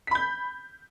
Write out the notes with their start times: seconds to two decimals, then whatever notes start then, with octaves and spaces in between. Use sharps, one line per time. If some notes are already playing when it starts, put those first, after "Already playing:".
0.07 B6
0.11 B5
0.15 G6